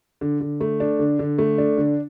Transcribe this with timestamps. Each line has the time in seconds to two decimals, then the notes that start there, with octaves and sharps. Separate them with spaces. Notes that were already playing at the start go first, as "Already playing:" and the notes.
0.21 D3
0.40 D3
0.61 A3
0.80 D4
0.99 D3
1.19 D3
1.38 A3
1.58 D4
1.78 D3